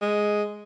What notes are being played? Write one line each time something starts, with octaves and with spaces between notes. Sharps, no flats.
G#3